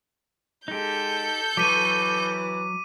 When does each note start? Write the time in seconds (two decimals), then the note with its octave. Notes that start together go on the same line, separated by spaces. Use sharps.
0.68 G#3 D#4 G4 A4 G6
1.57 E3 F#3 C#6 D6 B6 D#7